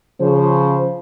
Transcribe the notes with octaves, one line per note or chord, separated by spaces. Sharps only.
C#3 F3 C5